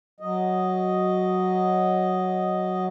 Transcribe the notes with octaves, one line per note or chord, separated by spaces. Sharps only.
F#3 D#5